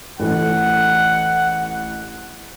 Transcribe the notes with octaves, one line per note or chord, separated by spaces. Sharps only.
A1 A4 F#5